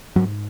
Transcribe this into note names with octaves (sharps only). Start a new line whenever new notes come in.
G#2 F#3